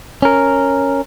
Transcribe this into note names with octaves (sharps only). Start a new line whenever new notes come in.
C#4 A#4